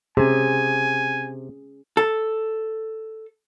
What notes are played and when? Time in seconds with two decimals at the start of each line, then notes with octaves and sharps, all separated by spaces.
0.17 C3 C#4 G#4 G#5
1.97 A4